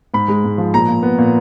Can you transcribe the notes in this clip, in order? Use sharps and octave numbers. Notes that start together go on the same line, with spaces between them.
G#2 B5
G#3
G#2
F3
A#2 A#5
A#2
B3
A#2